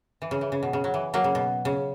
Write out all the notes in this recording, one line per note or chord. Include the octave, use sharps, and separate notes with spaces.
E3
C#3
E3
C#3
B2
C#3
F#3
E3
F#3 A#3
C#3
B2
C#3